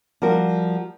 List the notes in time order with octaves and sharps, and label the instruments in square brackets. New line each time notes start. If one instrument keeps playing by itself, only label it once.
[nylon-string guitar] F3 G3 F#4 A#4